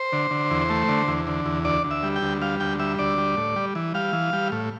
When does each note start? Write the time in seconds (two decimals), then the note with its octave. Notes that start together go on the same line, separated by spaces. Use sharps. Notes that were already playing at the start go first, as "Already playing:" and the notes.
Already playing: C5
0.13 D3
0.31 D3
0.51 E2
0.70 A3
0.88 D3
1.08 E2
1.27 D3
1.46 E2
1.65 D2 D5
1.84 D2
1.91 E5
2.03 G3
2.16 G5
2.22 D2
2.42 G3 F5
2.60 D2 G5
2.79 G3 E5
2.99 D2 D5
3.18 G3
3.37 A2
3.56 G3
3.75 E3
3.94 G3 F5
4.13 E3
4.33 G3
4.52 A2